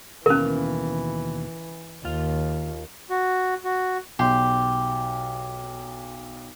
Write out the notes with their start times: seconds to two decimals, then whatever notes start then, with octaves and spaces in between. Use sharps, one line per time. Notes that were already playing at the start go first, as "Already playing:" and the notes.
0.26 D#2 B2 E3 C#4 A#4 F5
2.05 D#2 F4 F5
3.10 F#4
3.64 F#4
4.19 B1 G4 C6